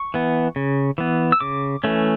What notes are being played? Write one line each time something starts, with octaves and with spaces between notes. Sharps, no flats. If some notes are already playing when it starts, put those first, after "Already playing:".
Already playing: C#6
E3 B3
C#3
E3 B3
E6
C#3 D6
E3 A3 C#4